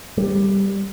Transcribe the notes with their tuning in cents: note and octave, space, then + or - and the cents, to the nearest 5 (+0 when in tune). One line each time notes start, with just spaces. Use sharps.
G3 +5